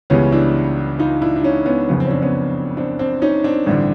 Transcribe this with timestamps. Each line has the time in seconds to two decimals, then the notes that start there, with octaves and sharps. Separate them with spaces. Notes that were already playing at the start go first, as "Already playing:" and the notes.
0.10 C#2 C#3 E3 G3 B3 C#4
0.32 D4 E4
0.99 D#4 F4
1.22 D4 E4
1.36 D4
1.43 C#4 D#4
1.66 B3 C#4
1.89 F#1 F2 C#3 F3 B3
2.00 C4
2.06 C#4
2.11 C4 D4
2.22 B3 C#4
2.77 C4 D4
2.99 C4 D4
3.22 C#4 D#4
3.44 C4 D4
3.66 A1 G2 D3